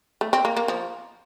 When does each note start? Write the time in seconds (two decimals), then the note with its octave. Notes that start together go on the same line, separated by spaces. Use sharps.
0.21 A3
0.33 C4
0.45 A#3
0.57 A#3
0.68 F3